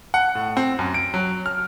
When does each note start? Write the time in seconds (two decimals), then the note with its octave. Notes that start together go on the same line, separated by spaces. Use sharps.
0.14 F#5
0.35 A2
0.57 C4
0.79 F#2
0.94 D7
1.14 F#3
1.46 F6